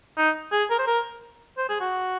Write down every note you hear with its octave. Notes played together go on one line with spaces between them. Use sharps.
D#4
G#4
A#4
C5
A#4
C5
G#4
F#4